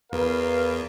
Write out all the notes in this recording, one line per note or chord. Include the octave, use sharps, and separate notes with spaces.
E2 A#4 B4 F5